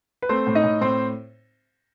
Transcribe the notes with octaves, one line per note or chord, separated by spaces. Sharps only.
B4
A3 C4 C5
A2
D#4 D#5
A2
A2 C4 C5